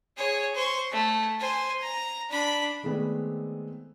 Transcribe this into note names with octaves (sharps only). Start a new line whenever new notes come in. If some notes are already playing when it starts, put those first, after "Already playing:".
G#4 C#5
C5 C#6
A3
C5 G#5
A#5
D4 B5
D#3 G#3 A3 B3 C4 D5